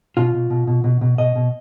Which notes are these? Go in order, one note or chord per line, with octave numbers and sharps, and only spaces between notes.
B2 F4
B2
B2
B2
B2
B2
B2 D#5
B2